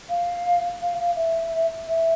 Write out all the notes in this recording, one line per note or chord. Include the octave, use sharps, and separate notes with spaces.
F5
F5
F5
E5
E5